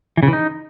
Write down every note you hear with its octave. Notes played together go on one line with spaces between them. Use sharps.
E3
C#3
E3
D#4